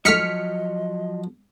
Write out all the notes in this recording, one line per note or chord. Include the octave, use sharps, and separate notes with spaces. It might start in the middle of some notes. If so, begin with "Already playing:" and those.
F3 F#3 A3 D#4 D#5 F6 B6 C#7